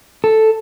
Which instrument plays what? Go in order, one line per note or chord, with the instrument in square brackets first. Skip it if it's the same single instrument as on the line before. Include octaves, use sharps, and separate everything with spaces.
[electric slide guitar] A4